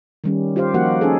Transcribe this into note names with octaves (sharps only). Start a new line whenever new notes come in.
D#3 G3 C#4
F4 G4 C5 F5
F3 A#3 D#4 F#4 G4 F#5
C#4 D#4 G#4 A4